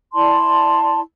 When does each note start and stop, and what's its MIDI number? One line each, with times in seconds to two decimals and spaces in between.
0.14 1.00 64
0.14 1.00 74
0.14 1.00 81
0.14 1.00 84